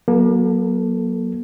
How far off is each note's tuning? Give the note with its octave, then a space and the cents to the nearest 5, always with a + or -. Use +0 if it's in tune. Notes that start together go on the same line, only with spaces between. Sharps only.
F#3 +0 A#3 +40 A4 +0